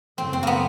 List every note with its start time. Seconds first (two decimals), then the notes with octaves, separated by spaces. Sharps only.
0.17 F#2 C#3 E3 A3 C4
0.33 C4
0.43 A#3 B3